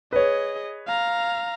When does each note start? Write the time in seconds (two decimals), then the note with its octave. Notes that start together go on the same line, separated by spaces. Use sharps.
0.13 G#4 B4 C#5 D#5
0.87 F5 A#5